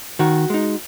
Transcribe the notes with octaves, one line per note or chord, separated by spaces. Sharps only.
D#3 F#4
G#3 D#4